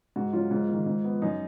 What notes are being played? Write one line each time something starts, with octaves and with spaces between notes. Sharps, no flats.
G#2 F#4
F#3 C#4 F4
G#2
D#3 A#3
G#2
F3 B3
F#2 D#4